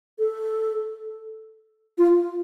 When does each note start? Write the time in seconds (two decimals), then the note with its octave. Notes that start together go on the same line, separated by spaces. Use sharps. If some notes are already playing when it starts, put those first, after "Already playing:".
0.19 A4
1.98 F4